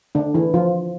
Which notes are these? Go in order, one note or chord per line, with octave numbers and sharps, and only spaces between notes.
D3 D4
E3 E4
F3 F4